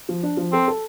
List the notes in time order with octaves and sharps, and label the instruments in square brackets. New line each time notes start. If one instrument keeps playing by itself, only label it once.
[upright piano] F3
D4
F3
[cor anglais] C4 [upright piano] A4
[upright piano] A4